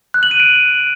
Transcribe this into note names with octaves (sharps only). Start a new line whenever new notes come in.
F#6
F#7
D#7
D7